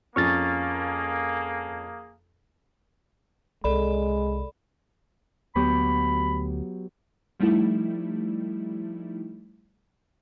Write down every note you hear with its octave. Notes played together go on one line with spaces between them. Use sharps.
F2 A#3 C#4 G#4 C#6 F6 A6
C2 G#3 A4 D5 B5
D2 F#3 B3 G4 B5
F3 G3 A3 D#4 E4